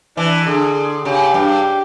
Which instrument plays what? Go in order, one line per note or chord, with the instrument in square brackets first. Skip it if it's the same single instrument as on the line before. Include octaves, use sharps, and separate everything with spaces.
[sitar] E3 [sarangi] D4
[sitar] D3 [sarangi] G#4
[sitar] C#3 [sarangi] G4
[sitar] G2